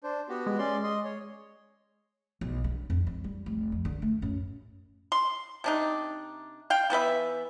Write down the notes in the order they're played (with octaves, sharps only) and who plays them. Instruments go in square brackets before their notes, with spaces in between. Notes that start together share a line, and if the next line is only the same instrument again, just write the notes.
[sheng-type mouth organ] D4 C5
B3 F#4 G4
[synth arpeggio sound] G#3
[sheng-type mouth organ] C#4 D5 C6
D#5 C6
C#5
[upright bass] B1
D4
F2
F#3
G3
F1
F2
D3
A3
F#2
[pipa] C6
C3 D4 D#4
F5 G5
E3 B3 B4 E5